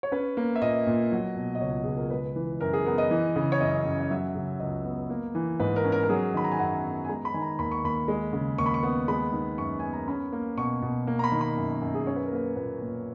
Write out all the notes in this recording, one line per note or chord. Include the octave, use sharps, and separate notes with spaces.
C#5
C#4 B4
A#3
E5
A#2 D#5
A#2
F#3
B2
D#5
C#2 C#5
C#2 G#4
A#4
G#3 B4
E3
F#2 A#4
G#4
B3 A#4
D#5
E3
C#3
C#5
F#2 D#5
F#2
D#5
F#3 E5
C#3
C#2 D#5
B3
A#3
E3
G#2 B4
A#4
C#4
A#4
A#4
F#3 G#4
D#3 B5
A#5
G#5
F#2 F#5
B3
G#5
G#3 A#5
B5
D#3 G#5
A#5
D#2 B5
C#6
D#2 B5
G#3
C#3
D#2 C#6
B5
C#6
B3
G#3 B5
D#3
F#2 C#6
B3 G#5
A#5
C#4 B5
A#3
B2 C#6
B2
A#3
A#5
B5
D#3
B5
F#2
F#2
G#4
C#4 C#5
B4
A#4
A#3 B4
A#2 B4
A#2